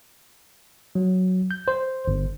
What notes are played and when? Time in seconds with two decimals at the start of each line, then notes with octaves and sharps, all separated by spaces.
0.95 F#3
1.51 G6
1.68 C5
2.08 G1